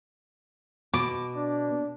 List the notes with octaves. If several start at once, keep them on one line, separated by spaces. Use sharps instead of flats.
B2 D6
D4